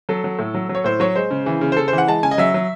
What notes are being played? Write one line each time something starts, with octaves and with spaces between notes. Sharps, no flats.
F#3 A4
F#3
A2
F#3
F#3
C#5
A2 C5
F#3 C#5
G#3 C5
C#3
E3
C#3
C5
C#3 A4
E3 C5
F#5
G#3 A5
C#3 G#5
D#5
F#3 E5
F#3